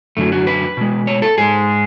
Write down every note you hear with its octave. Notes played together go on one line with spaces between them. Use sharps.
F#2 D3 F#3 A3
F#4
B4
B2 G#3
C#5
A4
G#2 G#3 G#4